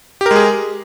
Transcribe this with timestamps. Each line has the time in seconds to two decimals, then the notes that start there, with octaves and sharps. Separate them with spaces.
0.21 G4
0.26 A#4
0.31 G#3
0.36 G#4